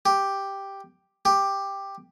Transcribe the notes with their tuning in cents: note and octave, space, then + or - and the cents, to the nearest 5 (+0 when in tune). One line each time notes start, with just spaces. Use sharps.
G4 +0
G4 +5